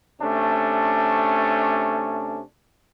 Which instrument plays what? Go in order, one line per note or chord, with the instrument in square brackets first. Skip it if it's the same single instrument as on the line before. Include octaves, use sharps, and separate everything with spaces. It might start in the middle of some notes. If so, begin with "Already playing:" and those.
[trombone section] C3 A3 C#4 D4